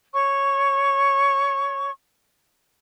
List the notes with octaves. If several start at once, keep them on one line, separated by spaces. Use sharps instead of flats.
C#5 C#6